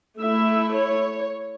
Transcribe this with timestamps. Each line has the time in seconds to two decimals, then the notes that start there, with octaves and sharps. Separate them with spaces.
0.19 A3 E4 E5
0.75 C#5